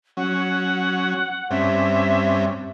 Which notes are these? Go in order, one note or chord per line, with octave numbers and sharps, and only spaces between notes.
F#3 C#4 F#5
G2 C4 C#4 E5